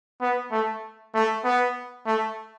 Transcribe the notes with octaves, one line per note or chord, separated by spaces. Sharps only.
B3
A3
A3
B3
A3